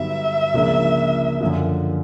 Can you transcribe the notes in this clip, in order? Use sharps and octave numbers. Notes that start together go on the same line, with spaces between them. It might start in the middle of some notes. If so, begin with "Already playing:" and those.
Already playing: G2 D3 F#3 B3 D#4 E5
C#2 C#3 F3 A#3 D4
F#2 D3 F3